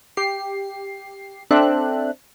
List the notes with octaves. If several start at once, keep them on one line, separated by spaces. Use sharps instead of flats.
G4 C7
C4 D4 A4 E5 F#6